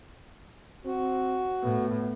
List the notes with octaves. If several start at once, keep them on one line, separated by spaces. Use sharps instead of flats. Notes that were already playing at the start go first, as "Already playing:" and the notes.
C4 F#4
A2 B3